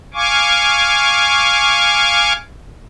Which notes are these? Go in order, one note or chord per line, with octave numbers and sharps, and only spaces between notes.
F5 G#5 C#6 D6